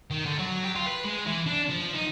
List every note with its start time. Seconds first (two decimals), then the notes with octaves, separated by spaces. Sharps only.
0.11 D#3
0.26 D3
0.39 F#3
0.63 G4
0.75 F4
0.87 B4
1.04 G#3
1.26 E3
1.46 D4
1.70 F3
1.95 D#4